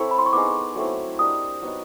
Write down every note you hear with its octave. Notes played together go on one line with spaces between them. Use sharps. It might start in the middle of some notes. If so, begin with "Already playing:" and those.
Already playing: C4 E4 A4 C#5
B5
C6
C#6
B3 D#4 G#4 D6
F#3 A3 C4 E4
D4 G4 A#4 D#5 D#6
F#3 B3 D#4